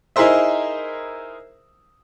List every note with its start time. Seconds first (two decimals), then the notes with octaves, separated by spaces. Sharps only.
0.16 D#4 E4 G#4 A#4 C5 E5